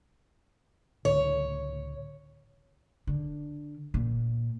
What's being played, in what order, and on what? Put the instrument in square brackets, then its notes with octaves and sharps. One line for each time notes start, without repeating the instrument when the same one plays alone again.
[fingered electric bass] C#2 A2 D3 [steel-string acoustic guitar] C#5
[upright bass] D3
A#2